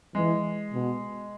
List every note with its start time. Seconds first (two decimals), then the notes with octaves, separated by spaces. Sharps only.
0.15 E3 G#3
0.73 B2